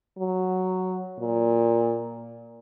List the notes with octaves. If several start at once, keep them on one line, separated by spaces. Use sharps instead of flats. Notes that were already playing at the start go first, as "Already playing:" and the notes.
F#3
A#2